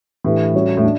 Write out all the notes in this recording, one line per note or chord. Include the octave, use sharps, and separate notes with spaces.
A2 E3 A3 D4 G4 B4
G3 C#4 F#4 C#5
A2
D4